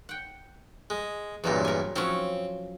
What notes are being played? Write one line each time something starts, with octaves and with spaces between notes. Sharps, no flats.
F#5 G5
G#3
E2 G2 A#2 F#3 C4
A#4 G#5
F3 F#3 C4 C#4